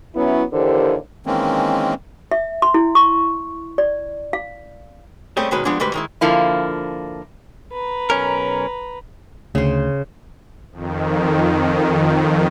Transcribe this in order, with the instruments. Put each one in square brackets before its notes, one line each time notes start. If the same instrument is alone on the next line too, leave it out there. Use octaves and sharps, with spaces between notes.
[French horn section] F#3 B3 C#4 E4
D#2 D3 E3 G4 A#4 C5
[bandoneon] D#3 E3 G#3 A#3 C4 C#4
[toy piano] E5
C6
E4
C#6
D5
F5
[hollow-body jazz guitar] G3 A3 C4 C#4 G4 G#4
B2 D#3 G#3 C#4 B4
F3 G3 G#3 B3 D4 G#5
D2 G#2 G3 B4
D#3 G#3 E4
[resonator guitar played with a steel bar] D3 F3 A#3 E4
[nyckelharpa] B4 A#5
[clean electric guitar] B1 C#4 A#4
[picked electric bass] D2 [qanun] C#3 C5
[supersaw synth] F2 D#3